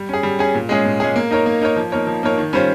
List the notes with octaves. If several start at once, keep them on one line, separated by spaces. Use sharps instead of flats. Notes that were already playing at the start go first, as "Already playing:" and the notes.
Already playing: G3
C#4 G#4
G3
C#4 G#4
A#2
G#3 C#4 G#4
A#2
G#3 C#4 G#4
A#3
D#4 A#4 C#5
A#3
D#4 A#4 C#5
F3
A#3 D#4 A#4 C#5
F3
A#3 D#4 A#4 C#5
D#3
G3 C#4 F4 C5